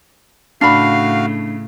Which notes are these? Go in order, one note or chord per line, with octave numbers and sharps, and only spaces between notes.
A2 C#3 D4 F#4 F5 B5 F6 C7